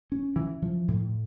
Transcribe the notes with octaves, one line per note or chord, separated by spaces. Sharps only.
C#4
E3
F3
A2